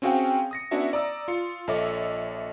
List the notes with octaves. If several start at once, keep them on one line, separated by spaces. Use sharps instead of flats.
C4 C#4 F#4 G#4 F5 G5
D#6 A#6 C#7
B3 C#4 D4 E4 F#4 E5
D5 A#5 D#6 E6
F4 C#7
A#1 A4 C#5 D#5 E5 D6